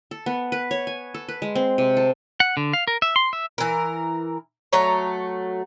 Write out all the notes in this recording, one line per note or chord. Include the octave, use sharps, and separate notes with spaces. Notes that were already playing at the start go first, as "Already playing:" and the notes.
A4
B3
B4
C#5
G#5
A4
B4
G#3
C4
C3
A4
F#5
D3
F5
A#4
E5
C6
E5
E3 A#4
F#3 A3 C#5 A#5